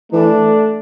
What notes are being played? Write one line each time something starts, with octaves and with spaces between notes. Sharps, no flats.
E3 A3 D4